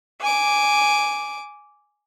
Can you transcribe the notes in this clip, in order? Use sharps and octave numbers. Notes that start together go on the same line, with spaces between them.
G#5 D6